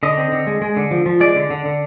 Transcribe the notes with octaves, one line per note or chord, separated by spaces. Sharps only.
D3 D#5
C4
D3
G#3
G#3
D3
F3
F3
G#3 D5
D3
D3
D3